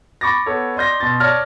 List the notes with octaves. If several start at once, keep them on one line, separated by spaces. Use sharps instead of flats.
B5 C#6 D6 A6 A#6
B3 A4 C#5
D5 D#5 C6 G6 A#6
B2 C6 A6
C#5 D5 A5 F6 A#6